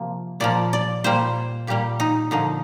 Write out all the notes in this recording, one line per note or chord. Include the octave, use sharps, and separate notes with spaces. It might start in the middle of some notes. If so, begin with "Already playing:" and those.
Already playing: C3 F3 A#3
A#2 F3 A#3 D5
D5
A#2 G3 A#3 C5
A#2 G3 A#3 G4
D#4
D3 F3 A#3 D#4